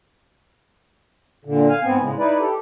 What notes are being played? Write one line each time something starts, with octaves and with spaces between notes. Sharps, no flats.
A#2 D3
F5 G#5
G#2 B3 C4 G#5
A2 C#3 G#3
D#4 E4 B4 D5
G4 A4